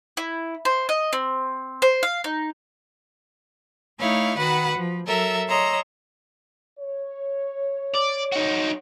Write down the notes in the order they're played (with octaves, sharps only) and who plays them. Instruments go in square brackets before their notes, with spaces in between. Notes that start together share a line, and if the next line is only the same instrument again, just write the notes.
[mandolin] E4
C5
D#5
C4
C5
F5
D#4
[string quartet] A3 D#4 E4 C#5 F5
D#3 F#4 B4 F#5 B5
F3
F#3 A4 A#4 E5
C#5 D#5 A#5 C6 E6
[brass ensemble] C#5
[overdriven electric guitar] D5
D#4 F#4